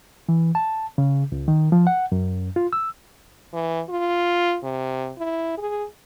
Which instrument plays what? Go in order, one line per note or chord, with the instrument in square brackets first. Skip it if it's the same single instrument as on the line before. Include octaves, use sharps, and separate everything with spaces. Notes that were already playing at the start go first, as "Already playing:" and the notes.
[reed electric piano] E3
A5
C#3
C#2
D#3
F3
F#5
F#2
F4
E6
[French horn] E3
F4
C3
E4
G#4